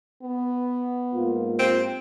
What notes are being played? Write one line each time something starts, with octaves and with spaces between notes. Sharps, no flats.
B3
G#2 A#3 F4
C4